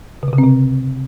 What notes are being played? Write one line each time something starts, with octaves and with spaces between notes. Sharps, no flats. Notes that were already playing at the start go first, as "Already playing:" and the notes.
C#3
C3
C#3
C4
C3